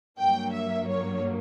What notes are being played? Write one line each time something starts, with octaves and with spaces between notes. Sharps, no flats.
G2 F#3 A#3 G5
E5
C#5